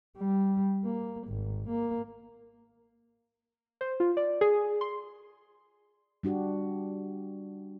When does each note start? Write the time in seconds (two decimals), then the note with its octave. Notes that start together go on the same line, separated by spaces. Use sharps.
0.18 G3
0.84 A#3
1.28 G#1
1.69 A#3
3.81 C5
4.00 F4
4.17 D5
4.41 G#4
4.81 C6
6.23 G3 D4 F#4 G4